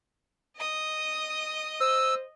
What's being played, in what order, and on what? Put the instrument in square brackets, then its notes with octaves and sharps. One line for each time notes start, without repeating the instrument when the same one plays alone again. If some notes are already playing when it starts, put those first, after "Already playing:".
[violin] D#5 D#6
[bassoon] C5 [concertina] E6